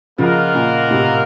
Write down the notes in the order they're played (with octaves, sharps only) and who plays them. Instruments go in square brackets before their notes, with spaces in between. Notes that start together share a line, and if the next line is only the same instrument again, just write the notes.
[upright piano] C#3 F3 [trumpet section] A#3 F4 A#4 D#5 F#5
[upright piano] A#2 C#3
A2 C3